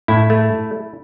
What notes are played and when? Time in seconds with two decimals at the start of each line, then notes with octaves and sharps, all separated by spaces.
0.08 A2 E4
0.30 A3